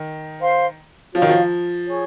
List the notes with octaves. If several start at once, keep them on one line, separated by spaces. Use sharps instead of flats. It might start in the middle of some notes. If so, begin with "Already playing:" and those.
Already playing: D#3
C5 F5 C6
F3 F#4 C#5 F5
D#3
F3
G#4 C#5 G#5 C#6